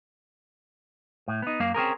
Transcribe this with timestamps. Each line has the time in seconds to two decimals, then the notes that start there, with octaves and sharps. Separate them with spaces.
1.28 A2
1.42 B3 D#4
1.60 F#2 A#3 F5
1.74 C4 C#4 G#4 A#4